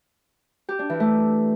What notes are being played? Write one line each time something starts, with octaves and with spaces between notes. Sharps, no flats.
G4
D4
E3
A3